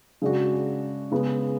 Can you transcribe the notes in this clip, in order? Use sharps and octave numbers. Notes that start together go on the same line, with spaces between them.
C#3 G#3 D4 F#4
C#3 G#3 B3